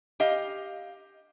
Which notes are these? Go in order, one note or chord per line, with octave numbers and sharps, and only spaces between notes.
G4 D#5 F5